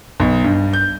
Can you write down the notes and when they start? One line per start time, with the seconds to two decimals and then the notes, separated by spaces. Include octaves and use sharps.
0.20 B1
0.44 G2
0.73 G6